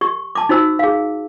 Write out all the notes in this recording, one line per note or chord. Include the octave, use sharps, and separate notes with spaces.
G4 C#6
A5 D6
D#4 F#4 C5 E6
G#4 F5